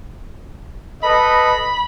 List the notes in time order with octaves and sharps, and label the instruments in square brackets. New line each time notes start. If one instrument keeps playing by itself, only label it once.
[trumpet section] A4 B4 D#5 [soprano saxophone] B5